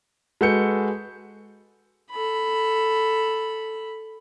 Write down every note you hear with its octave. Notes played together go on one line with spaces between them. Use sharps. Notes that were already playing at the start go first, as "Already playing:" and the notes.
G#3 F#4 A4 B4 G6 C#7
A4 B5